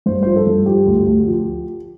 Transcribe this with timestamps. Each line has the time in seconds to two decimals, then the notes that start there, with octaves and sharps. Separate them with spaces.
0.06 G2 C5
0.23 F3 C5
0.36 A4
0.47 G2
0.66 F3 G4
0.87 D2
1.06 D2
1.27 F3